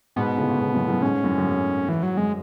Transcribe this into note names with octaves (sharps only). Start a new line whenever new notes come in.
G#2 B2 B3
A2 C#3
C#3
G#2 B2
F#2 A2
B2
F#2 A2
G#2 C#4
F#2 A2
F#2
G#2
E3
F#3
F#2 G#3